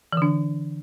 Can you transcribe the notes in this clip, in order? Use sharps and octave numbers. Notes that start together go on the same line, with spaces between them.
D3 E3 D4